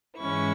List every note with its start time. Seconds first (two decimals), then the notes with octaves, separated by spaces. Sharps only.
0.19 G#2 E3 G#3 C#4 E4 C#6